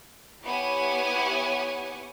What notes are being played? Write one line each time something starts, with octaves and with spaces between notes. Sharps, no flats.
B3 E4 G4 C#5 F#5 G#5